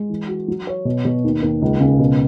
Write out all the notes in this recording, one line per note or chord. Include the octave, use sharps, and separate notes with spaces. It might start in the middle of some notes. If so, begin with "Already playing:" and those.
Already playing: G#3
E3
F#4
F#3
C#5
B2
B2
D#2
D#2
C#2
C#3
B2